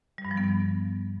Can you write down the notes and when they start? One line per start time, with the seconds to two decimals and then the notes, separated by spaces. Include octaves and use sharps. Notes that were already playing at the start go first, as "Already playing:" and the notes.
0.18 G3
0.25 G2
0.31 F3
0.37 B3